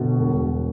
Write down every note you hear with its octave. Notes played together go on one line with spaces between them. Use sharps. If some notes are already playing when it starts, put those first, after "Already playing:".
Already playing: G1 B2
E1